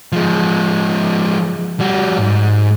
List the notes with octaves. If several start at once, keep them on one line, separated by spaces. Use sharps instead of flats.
F3 G#3
G3 F#4
G#2